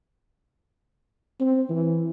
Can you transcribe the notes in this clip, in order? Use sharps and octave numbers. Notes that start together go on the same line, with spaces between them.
C4
E3